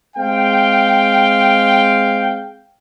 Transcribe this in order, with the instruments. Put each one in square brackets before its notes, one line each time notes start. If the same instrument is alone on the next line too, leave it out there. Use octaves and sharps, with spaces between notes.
[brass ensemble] G#3 C4 F5 G5